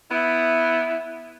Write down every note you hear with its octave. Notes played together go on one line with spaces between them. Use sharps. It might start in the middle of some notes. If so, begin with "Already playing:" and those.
B3 E4